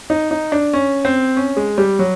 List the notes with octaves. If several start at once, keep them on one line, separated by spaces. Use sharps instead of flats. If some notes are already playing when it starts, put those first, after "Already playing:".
D#4
D#4
D4
C#4
C4
C#4
G#3
G3
F#3